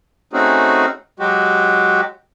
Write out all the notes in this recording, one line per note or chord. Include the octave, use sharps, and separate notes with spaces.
A3 C4 C#4 D#4 F#4 G#4
F#3 G#3 F#4 G4